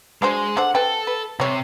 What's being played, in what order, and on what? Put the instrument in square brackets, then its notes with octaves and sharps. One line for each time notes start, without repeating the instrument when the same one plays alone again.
[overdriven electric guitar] G#3 [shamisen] D4 F#4 C5
[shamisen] D4 A4 C5 [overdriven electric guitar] F#5
[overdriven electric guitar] A4 [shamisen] B4 G5
[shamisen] B4
[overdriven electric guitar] C3 [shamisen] G3 C#5